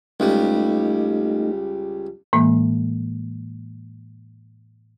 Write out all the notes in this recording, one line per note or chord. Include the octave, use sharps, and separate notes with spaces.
C#2 G3 A3 D#4
A2 E3 G#3 A#3